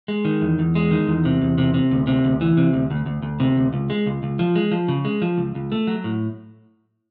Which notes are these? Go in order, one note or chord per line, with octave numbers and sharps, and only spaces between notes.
G#3
D#3
E2
E2
G#3
D#3
E2
C3
E2
C3
C3
D2
C3
D2
E3
C3
D2
D2
D2
D2
C3
D2
C#2
G#3
C#2
C#2
F3
G#3
F3
C#3
G#3
F3
C#2
C#2
A3
F#3
A2